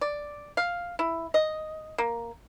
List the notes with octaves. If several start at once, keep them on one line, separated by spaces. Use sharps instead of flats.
D5
F5
E4
D#5
A#3